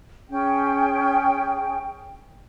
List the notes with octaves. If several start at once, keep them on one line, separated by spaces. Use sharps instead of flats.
C#4 G#4 G5